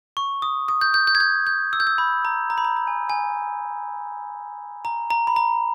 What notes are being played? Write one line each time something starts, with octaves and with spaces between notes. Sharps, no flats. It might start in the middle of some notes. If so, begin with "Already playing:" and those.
C#6
D#6
D#6
G6
G6
G6
G#6
G6
G6
E6
G6
E6
B5
A#5
A#5
B5
A#5
A#5
G#5
G#5
A#5
A#5
B5
A#5